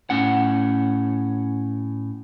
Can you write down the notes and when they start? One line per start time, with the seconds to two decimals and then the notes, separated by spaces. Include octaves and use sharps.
0.10 A2 C#4 F#5